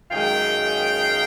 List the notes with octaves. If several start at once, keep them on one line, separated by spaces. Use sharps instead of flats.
F#2 D#3 G#3 F5 G5